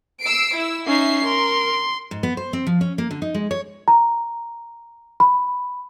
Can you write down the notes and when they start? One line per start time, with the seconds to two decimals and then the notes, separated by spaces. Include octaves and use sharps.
0.21 E6 C7 D7
0.53 E4 E6
0.86 C#4 D#4 E5 C7
1.25 A#4 C6
2.11 G#2
2.23 B3
2.37 C5
2.53 C4
2.67 F3
2.81 C#4
2.98 A#3
3.11 D3
3.22 D#4
3.34 G#3
3.51 C#5
3.88 A#5
5.20 B5